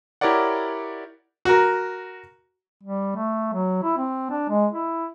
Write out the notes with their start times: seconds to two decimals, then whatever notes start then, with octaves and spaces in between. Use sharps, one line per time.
0.21 E4 G4 A#4 C#5 D5 F#5
1.45 F#4 A#4
2.83 G3
3.16 A3
3.53 F#3
3.83 E4
3.98 C4
4.31 D4
4.50 G#3
4.72 E4